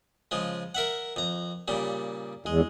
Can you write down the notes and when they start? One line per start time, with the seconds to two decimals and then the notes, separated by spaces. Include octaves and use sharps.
0.31 C#3 F3 G#3
0.75 A#4 E5 F#5
1.16 F2 A#5
1.68 A#2 C#3 G3
2.46 E2 G#3